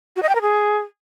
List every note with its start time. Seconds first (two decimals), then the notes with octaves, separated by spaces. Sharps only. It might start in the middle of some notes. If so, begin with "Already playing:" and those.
0.16 F#4
0.22 D#5
0.29 G5
0.35 A#4
0.41 G#4